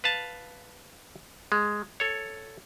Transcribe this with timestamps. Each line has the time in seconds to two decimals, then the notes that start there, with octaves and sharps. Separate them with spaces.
0.04 B4 F5 A5
1.52 G#3
2.00 A4 C#5